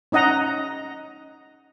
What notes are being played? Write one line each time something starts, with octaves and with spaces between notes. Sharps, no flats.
C#4 D#4 D#5 F#5 A#5